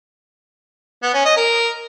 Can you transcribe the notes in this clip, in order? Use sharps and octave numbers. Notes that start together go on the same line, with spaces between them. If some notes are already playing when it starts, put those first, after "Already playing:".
B3
C#4
D#5
A#4